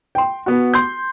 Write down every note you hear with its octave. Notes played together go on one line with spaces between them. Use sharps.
G5 C6
B3 F#4
C6 G6